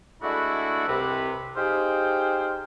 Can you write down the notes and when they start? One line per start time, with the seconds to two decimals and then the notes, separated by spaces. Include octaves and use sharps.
0.22 G#3 A3 D4 E4 F#4
0.87 C2 C3 B4
1.57 D#4 G4 G#4 C5 F5 G5